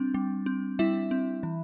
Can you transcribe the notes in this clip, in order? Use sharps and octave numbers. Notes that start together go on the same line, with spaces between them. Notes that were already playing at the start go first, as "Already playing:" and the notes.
Already playing: G3 C4 D4
G3
C4
G3 E4 E5
C4
E3